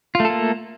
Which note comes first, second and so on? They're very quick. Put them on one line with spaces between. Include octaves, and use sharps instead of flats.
F4 A3 A4 A#3